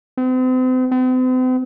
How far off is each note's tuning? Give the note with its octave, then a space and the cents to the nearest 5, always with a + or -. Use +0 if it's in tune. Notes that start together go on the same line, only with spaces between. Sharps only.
C4 -40
C4 -45